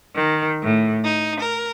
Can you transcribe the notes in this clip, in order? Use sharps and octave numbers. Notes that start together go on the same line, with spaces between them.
D#3
A2
D#4
A#4